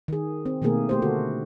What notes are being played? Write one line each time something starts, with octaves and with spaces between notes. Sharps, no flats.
D#3 G#4
C4
B2 D#3 A3 A#3 G#4 A#4
A3 G4 C5
D3 F#4 A4